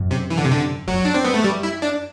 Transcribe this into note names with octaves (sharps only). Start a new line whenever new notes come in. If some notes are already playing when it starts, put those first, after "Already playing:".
Already playing: F#2
C3
E3
D3
C3
D3
F#2 F#3
D4
C4
B3
A3
G3
E4
D4